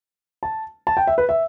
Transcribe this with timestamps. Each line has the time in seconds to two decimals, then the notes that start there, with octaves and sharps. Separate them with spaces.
0.43 A5
0.87 A5
0.97 G5
1.07 E5
1.18 B4
1.29 E5